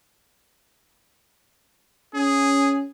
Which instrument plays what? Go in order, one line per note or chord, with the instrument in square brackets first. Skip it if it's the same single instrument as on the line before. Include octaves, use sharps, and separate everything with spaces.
[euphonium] C#4 [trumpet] G#4